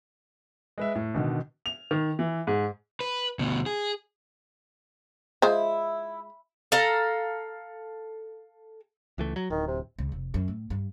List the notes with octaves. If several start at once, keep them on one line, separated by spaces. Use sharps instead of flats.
G#3 B4 E5
A2
B2 D3 D#3
F7
D#3
E3
G#2
B4
D2 B2
G#4
G#3 E4 F4 C5
A4 F5 A#5
C#2 E3 A3
F#3
D1 D#3
C3
C#2
F1
F#2
A2
G2